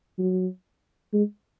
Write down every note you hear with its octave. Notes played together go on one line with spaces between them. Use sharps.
F#3
G#3